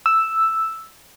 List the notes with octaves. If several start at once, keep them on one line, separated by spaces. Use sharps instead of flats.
E6